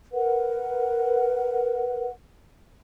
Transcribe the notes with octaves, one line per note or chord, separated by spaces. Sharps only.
A#4 B4 F#5